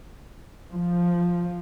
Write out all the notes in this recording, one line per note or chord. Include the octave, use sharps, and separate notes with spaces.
F3